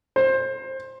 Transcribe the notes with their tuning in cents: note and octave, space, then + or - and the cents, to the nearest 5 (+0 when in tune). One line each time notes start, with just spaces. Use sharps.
C5 +15